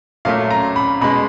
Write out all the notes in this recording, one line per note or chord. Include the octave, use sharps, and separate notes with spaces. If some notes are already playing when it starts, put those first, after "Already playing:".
A#2 F#3 A3 F5
A#5
B5
B2 G#3 B5